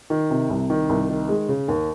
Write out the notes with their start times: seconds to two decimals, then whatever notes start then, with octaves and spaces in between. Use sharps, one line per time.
0.10 D#3
0.30 C3
0.50 C2
0.70 D#3
0.89 C2
1.09 D#3
1.29 G#3
1.48 C#3
1.68 D#2